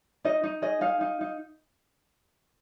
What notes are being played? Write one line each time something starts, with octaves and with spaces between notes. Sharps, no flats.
D#4 D#5
D#4
G#4 D#5
D#4 F5
D#4
D#4